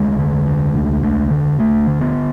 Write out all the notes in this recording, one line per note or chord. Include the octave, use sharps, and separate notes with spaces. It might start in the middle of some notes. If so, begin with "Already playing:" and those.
Already playing: D2 G#3
D3
D2
D3
D2
D3
D2 A3
D3
B3